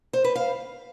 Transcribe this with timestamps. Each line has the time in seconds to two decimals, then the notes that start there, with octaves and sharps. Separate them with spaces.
0.13 C5
0.24 B4
0.35 F5